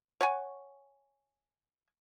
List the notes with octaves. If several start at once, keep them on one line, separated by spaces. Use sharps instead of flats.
C#5 F#5 G#5